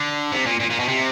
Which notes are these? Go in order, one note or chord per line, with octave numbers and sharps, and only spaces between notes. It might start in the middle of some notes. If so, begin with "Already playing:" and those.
Already playing: D3
C3
A#2
A#2
A#2
B2
C3